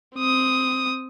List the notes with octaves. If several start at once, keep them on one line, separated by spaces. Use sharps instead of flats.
C4 D#6